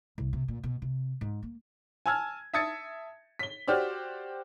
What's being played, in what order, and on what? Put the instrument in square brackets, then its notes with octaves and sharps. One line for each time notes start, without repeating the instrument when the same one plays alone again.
[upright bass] C2
C3
A#2
B2
C3
G#2
A#3
[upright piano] G#5 A5 E6 F6 G#6
E5 A5 D#6 G#6 A6 C#7
B6 G7
F#4 G4 C5 D5 F6